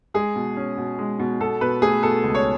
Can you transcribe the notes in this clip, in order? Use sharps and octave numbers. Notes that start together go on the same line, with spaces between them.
G#3 G#4
B2
C#4
B2
G#3
B2
B2 A4
B2 B4
A3 G#4
B2 A4
C#2
C#5